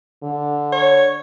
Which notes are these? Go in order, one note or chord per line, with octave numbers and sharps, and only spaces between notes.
D3
C#5